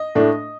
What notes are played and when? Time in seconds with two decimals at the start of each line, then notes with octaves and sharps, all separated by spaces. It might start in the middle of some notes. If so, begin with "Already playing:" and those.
Already playing: D#5
0.15 A2 A3 D4